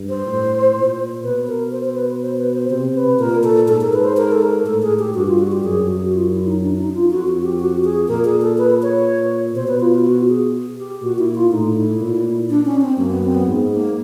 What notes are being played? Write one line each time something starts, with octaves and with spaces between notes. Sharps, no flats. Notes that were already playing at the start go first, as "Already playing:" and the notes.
Already playing: G2
C5
A2
A#2
B2 B4
A#4
C5
C5
B4
C5
B4
C5
C3 C5
B4
A#2 A#4
A4
G#2 A4
A#4
B4
C5
A#4
A4
A#4
A2 A4
G#4
G4
G2 F#4
F4
F#4
G4
F#2 G#4
F#4
F4
E4
D#4
D4
D#4
F4
F2 F#4
F#4
G4
F#4
G#4
A#2 A#4
G#4
A4
B4
C#5
B2 C5
B4
F4
F4
F#4
G#4
G4
A#2 F#4
E4
F4
A2 D#4
E4
A#2
D4
C#4
C4
F#2 A#3
B3
C4
B3
G#2
A#3